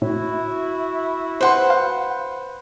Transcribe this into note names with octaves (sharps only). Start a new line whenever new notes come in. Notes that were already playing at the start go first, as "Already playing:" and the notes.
A2 E4 F#4
B4 C5 F#5 C6
F5